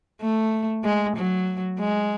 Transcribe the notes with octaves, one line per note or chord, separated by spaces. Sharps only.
A3
G#3
F#3
G#3